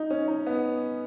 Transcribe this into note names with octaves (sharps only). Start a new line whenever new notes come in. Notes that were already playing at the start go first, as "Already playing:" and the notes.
Already playing: D#4
C#4
D#4
B3